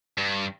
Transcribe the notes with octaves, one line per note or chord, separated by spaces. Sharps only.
G2